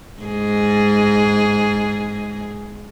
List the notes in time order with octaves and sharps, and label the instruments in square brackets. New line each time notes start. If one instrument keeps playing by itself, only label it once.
[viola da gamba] G#2 G#4